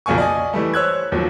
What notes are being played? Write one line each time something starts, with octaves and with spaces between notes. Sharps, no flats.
B1 F2 C#3 A#3 G#5 C#6
D5 D#5 G#5
E3 G3 A3
C5 C#5 E6 F#6 G#6
D#2 F3 F#3